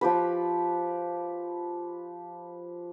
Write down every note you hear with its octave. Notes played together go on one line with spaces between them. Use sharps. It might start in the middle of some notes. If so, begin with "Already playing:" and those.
F3 G4 B4